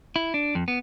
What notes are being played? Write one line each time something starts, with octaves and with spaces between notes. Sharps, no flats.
E4
D4
F2
B3